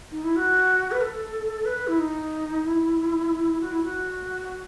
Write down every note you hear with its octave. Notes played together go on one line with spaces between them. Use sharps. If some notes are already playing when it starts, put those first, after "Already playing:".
D#4
E4
F#4
B4
A4
B4
E4
D#4
E4
F#4
E4
F#4